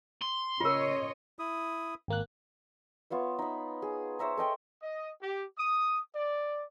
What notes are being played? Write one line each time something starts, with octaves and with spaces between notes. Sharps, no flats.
C6
C#3 F4 A#4 C#5 D#5
E4 D#6
G#1 A#3 F#6
B3 F4 C#5 E5
D#4 B5
G#4
C5 C#5 E5 A#5
A4 D#5 G5 C6
D#5
G4
D#6
D5